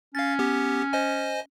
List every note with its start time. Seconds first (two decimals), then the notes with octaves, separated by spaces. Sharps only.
0.15 C#4 F5 A6
0.39 B3 G4
0.93 C5 D#5 G#5